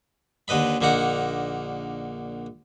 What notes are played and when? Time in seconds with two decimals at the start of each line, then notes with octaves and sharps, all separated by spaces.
0.48 D#2 D3 B4 D#5 B5
0.81 A#1 D3 A#3 D#4 F#5